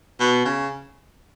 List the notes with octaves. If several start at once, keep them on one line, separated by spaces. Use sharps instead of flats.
B2
C#3